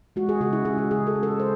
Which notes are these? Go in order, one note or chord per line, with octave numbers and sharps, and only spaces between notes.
G#3 F#4
G#4
C#3 F#4
E4
G#3 G#4
F#4
C#3 G#4
A4
G#3
A4
C#3 C5